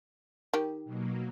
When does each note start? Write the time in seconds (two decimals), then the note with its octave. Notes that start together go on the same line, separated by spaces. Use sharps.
0.54 D#3 G4
0.84 B2 F#3 A#3